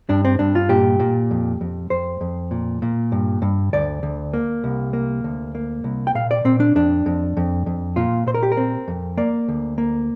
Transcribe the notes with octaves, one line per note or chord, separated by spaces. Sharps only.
G2 D4
C4
G2 D4
F4
A#2 G4
A#2
F2
F2
F2 C5
F2
A#2
A#2
G2
G2
D2 D5
D2
A#3
C2
A#3
D2
A#3
C2
G5
A#2 F5
D5
A#2 C4
D4
F2 D4
F2
F2
F2
A#2 F4
A#2 C5
A#4
G4
A#4
C4
F2
A#3 D5
D2
A#3